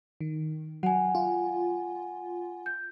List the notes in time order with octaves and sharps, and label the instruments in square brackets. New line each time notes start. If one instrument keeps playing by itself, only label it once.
[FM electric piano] D#3
[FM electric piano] F#3 [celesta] F#5 G#5
[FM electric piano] F4
[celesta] G6